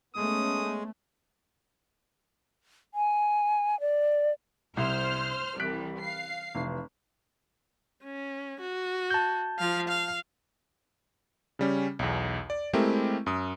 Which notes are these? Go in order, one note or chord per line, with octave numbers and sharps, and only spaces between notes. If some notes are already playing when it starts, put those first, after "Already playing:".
G#3 A3 B3 C#4 D#6
G#5
D5
C2 C5 F6
C2 E3 G3 F#6 B6 D7
F5 C7
F1 E3
C#4
F#4
A5 G6
F3 F5
F5
C#3 G3 C#4
B1 E2
D5
G#3 A3 C4 E4 G4 A#4
F#2 D#6